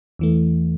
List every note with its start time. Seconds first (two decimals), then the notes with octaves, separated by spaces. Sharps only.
0.19 E2 E3 A3